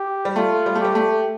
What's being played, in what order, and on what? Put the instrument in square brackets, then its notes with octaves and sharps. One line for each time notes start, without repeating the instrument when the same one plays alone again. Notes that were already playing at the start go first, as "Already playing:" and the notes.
Already playing: [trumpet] G4
[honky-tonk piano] G3
[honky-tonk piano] A3 [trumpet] F4
[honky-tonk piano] G3
A3
[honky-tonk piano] G3 [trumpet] G4
[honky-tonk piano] A3